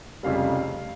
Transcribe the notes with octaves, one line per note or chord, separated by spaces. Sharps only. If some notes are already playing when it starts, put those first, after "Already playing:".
F1 F2 C#3 G3 F5